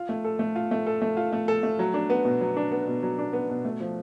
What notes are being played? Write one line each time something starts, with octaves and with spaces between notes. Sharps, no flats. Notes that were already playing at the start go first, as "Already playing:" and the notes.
Already playing: F4
A3
A4
A3
F4
A3
A4
A3
F4
A3
A4
A3
F#3
D4
B3
B2
F#3
D4
B3
B2
F#3
D4
B3
B2
A3
F3